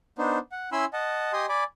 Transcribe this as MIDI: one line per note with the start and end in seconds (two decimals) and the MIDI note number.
0.18 0.39 59
0.18 0.39 62
0.18 0.39 63
0.18 0.39 72
0.52 0.70 78
0.72 0.85 61
0.72 0.85 64
0.72 0.85 80
0.72 0.85 83
0.72 0.85 84
0.72 0.85 88
0.93 1.32 75
0.93 1.32 78
0.93 1.32 81
1.33 1.46 67
1.33 1.46 75
1.33 1.46 80
1.33 1.46 84
1.33 1.46 87
1.49 1.64 74
1.49 1.64 80
1.49 1.64 83
1.49 1.64 86